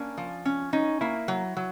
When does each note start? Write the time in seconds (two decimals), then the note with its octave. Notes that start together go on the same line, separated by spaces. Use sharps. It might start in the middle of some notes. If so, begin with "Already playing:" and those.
Already playing: A#3 C#4 D4
0.18 F3
0.45 C#4
0.73 C#4 D#4
1.01 A#3 E4
1.28 F#3
1.57 F#3